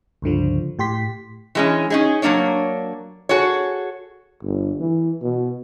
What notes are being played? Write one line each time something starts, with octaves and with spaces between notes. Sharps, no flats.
C#2 G2 D3 F3
A2 G4 C6 B6
E3 G#3 C#4
C#4 D#4 G#4
F#3 G#3 A#3 D4 C#5
F#4 G#4 A4 C#5
G1
E3
B2